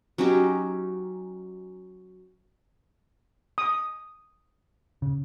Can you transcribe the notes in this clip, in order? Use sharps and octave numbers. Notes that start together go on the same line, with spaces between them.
F#3 C#4 D#4 G4
D#6
C#3